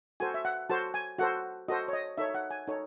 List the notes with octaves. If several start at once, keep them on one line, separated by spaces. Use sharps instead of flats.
F#4 A4 C5 G#5
E5
F#5
F#4 A4 C5 A5
G#5
F#4 A4 C5 F#5
F#4 A4 C5 D#5
C#5
D#5
D#4 A4 C#5 E5
F#5
G#5
D#4 A4 C#5